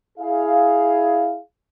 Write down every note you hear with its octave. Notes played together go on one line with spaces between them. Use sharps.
E4 G#4 F5